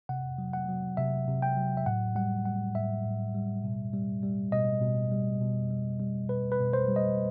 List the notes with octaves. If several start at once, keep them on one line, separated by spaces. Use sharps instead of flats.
C3 F#5
F#3
F#5
F#3
C3 E5
C3
G5
F#3
E5
A2 F#5
G3 F#5
G3 F#5
A2 E5
A2
G3
B2
G3
G3
B2 D#5
B2
G3
B2
G3
G3
B2 B4
B4
B2
C5
G3
D#5